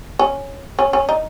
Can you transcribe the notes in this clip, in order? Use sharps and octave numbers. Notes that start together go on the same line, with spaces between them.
C#4
C#4
C#4
D#4